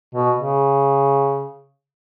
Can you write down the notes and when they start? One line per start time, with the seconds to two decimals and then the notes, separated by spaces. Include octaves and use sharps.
0.15 B2
0.37 C#3